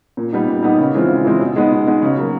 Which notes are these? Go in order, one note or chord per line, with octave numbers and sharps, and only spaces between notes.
A#2
G3 B3 D#4
A#2
G3 B3 D#4
C#3
E3 G#3 C4 F4
C#3
E3 G#3 C4 F4
B2
G#3 B3 D#4
B2
G#3 B3 D#4
C#3
F#3 A#3